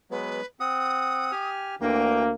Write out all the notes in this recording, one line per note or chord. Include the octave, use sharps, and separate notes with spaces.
F#3 G#3 B3 B4
C4 F#5 D#6
G4 G#5 F6
D2 D3 E3 A#3 G5